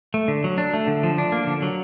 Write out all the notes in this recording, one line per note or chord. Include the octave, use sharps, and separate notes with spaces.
A3
D3
F#3
D4
A3
D3
F3
D4
A#3
D3
F#3